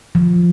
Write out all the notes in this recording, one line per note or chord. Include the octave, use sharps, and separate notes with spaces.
F3